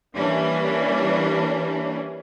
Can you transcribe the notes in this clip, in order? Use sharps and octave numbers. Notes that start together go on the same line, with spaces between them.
E3 G3 A#3 C#4 D4